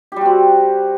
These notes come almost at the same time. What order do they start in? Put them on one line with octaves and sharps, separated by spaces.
G4 G3 F#4 C4